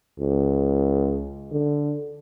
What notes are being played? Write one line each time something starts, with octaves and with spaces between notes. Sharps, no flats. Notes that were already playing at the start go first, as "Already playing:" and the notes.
C#2
D3